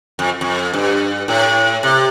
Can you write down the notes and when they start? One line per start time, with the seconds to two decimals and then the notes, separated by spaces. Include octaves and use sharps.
0.19 F2
0.41 F2
0.74 G2
1.28 A2
1.83 C3